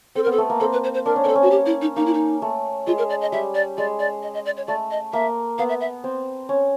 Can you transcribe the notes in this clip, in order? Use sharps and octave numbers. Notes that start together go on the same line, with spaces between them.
C4 A4
A#4
B3
A4
A3
A#3
C4 A4
B4
C5
C5
D4 A#4
C#4
C4 A4 A#4
C#4
F#4
G4
E4
D#4
A#3 D#4
E4
D#4
A3
G#3 F4
A#4
D5
D#5
G3 E5
D5
G#3 D5
D5
D#5
D#5
D5
C#5
A3 D5
D#5
A#3 E5
B3 F5
E5
E5
C4
C#4